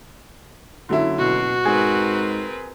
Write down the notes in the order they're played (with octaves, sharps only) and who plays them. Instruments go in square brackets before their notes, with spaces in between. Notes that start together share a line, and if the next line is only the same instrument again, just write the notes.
[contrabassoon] F#1 [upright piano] D3 F#3 E4
[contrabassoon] F#1 [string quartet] B2 [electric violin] F#4
[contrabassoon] G#2 [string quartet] C4 A#4 B4 [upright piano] G#4